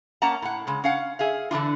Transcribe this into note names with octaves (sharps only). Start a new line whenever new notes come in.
A#3 C#4 F#5 A5 A#5
A2 F#5
C#3 G#3
C#4 F5 F#5
G#4 E5 F5
D3 E3 D4 F4